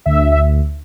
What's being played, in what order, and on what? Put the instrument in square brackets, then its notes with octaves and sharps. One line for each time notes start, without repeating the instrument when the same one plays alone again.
[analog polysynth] D2 E5
E5